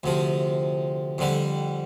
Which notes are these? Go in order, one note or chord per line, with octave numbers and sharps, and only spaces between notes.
D2 C3 F3
F2 D3 G3